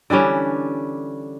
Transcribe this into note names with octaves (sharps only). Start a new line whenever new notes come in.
D3 E3 G3 C#4